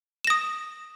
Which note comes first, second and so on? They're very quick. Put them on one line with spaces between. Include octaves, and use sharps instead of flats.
E7 A#6 D#6